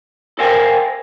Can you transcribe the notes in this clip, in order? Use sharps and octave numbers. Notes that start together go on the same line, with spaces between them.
A4 A#4 C5 F5 G5 G#5